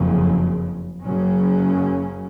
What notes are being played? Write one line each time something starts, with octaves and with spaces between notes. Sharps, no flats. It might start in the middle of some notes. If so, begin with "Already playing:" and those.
Already playing: F#1 F2 C#3
F#1 F#2 C#3 F#3 C#4